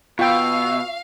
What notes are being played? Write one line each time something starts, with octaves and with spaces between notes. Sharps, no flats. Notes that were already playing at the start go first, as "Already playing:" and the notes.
B2 F4 F5 G5 C#6 E6